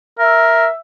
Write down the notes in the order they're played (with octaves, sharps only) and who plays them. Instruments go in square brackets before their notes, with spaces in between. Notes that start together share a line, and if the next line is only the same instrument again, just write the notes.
[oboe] A#4 [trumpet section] E5